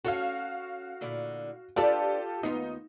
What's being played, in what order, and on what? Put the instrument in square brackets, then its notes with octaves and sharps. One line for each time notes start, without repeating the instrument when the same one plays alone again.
[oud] C#4 A4 C#5 [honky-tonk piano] F#4 F5
[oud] A#2 D3 E4
[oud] D4 B4 D5 [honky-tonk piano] F4 G4 A4
[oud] D#2 B3 F4 [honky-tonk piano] D#4